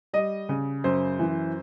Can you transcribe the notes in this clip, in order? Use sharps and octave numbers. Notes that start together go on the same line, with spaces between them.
G3 D#5
C#3
F#2 C5
E3